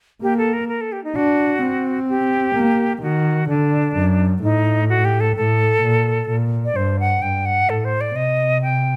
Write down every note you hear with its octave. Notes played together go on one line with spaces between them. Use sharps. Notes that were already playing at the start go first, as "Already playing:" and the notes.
A#3 G4
A4
A#4
A#4
A4
G4
D#4
D4 F#4
C4
G4
A#3
D#3 F#4
D3 D4
F#2
A2 D#4
F#4
G4
A4
A2 A4
A#2
A#2
D5
G2 C5
F#5
G2 G5
F#5
A2 A4
C5
D5
C3 D#5
G5